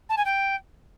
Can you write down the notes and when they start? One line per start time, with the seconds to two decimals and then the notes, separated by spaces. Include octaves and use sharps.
0.09 A5
0.17 G#5
0.25 G5